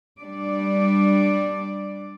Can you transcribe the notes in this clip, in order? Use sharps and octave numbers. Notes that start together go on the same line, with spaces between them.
G3 D4 D5